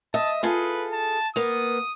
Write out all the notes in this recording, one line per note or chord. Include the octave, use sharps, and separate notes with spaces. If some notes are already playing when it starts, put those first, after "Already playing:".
D#5 E5 A5
F4 G#4 A4 B4
A5
A#3 B3 D#6